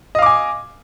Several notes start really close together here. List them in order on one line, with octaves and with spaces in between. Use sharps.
D#5 F5 D6 G#5